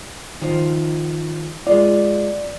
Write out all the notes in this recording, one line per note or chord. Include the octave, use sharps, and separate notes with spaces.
D#3 F3
G#3 F4 D5